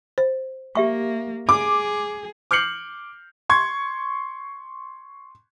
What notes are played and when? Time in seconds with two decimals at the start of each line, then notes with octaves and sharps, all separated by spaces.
0.18 C5
0.75 A#3 G4 E5 C#6
1.49 G#4 D6
2.51 D6 F6 G6 C7 C#7 F#7
3.50 C6 C#6 G#6